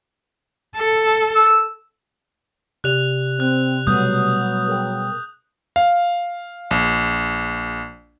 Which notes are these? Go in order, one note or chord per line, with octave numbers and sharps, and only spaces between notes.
A4
E6
C3 G4 D5 F#6 F7
C4 F#6
B2 F#3 G3 A3 B3 D#6 G6
G#4 A#4 G5
F5
A#1